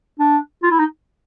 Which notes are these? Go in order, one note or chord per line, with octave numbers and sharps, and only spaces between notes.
D4
F4
E4
D#4